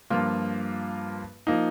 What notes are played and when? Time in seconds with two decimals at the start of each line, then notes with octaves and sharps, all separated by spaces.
0.10 G2 F3 A#3 F4
1.47 F3 A#3 D#4